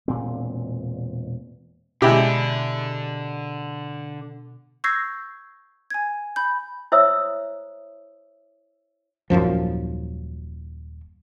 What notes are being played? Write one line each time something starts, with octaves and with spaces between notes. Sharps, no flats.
E1 A#2 C4
B2 D3 G#3 D4 E4 G4
C#6 E6 G6 G#6 A#6 C7
G#5 G#6
B5 G6
E4 C5 C#5 E5 D#6 E6
D#1 A#1 F#2 F3